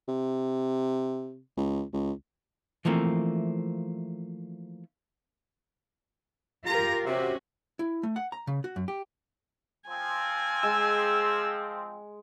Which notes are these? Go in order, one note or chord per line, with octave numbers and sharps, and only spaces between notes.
C3
C#2
C#2
E3 F3 A3 A#3 C4
F4 G4 A#4 A#5
C3 C#4 F#4
E4
A3
F#5
A#5
C#3
F#4
F#2
G4
F3 C4 G#5
G#3 E6